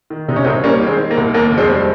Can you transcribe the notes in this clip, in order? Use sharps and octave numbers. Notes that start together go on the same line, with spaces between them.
D#3
C3 D#4
C#4
C2 C4 D#4
G3 A#3 C#4
D#3
G#3 C4
D#3
A#3
C2
D#2 A#3
F1
G#3 C4
G3